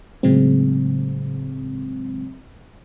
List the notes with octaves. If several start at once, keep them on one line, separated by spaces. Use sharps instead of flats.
A2 C#3 F#3 G#3 C4